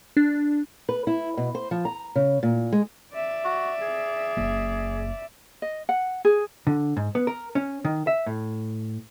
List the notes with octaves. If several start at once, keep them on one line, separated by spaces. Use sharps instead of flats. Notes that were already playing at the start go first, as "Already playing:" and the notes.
D4
B4
E4
B2
C5
F3
A#5
C#3
A#2
G#3
D5 E5
F#4
G#4
F#1
D#5
F#5
G#4
D3
G#2
B3
A#4
C#4
D#3
E5
A2